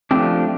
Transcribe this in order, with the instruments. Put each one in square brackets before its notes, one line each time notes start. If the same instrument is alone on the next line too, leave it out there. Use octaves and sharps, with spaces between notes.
[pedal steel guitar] F3 A3 D4 G4 [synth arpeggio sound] C4